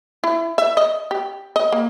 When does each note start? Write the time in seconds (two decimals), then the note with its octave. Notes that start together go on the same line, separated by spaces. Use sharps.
0.24 E4
0.58 E5
0.77 D#5
1.11 G4
1.56 D#5
1.72 A#3